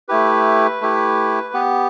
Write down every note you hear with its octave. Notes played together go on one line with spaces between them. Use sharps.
A3 E4 G4 B4
A3 E4 G4
B3 G4